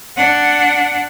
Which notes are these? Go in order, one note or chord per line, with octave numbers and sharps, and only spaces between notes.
D4 F#5